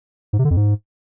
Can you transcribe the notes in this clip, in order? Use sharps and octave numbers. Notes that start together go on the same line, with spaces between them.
G#2
C3
D3
F2
G#2